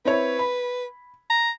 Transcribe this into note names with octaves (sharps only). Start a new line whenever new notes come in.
C4 E4 B4 C#5
B5
A#5